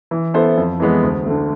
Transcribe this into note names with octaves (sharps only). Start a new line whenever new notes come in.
E3
B3 E4 A4 C5
F2
E3 G#3 B3
D2
D3 A3